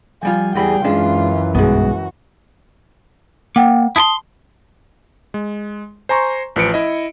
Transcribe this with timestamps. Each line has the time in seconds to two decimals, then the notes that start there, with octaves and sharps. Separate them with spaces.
0.23 F3 G3 F4 G#5
0.55 E2 E3 G3 G#4 G5 B5
0.84 F#2 E3 G#3 C#4 D4 F4
1.55 B1 G2 G#3 B3 F#4
3.56 A#3 F#5 G5
3.96 E4 A5 C6 D#6
5.34 G#3
6.09 C5 G#5 A#5 C6 C#6
6.56 A1 F3 B4 C#7 D7
6.74 E4 D#5